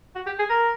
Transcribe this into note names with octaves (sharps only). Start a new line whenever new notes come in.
F#4
G4
G#4
A#4